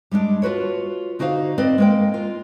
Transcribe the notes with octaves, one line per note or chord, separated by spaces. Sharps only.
G3 G#3 C#4 D4
F4 F#4 B4 C#5
D3 D#4 F#4 C5 F5
C4 B4 D5 D#5
G#3 A#3 G5
F4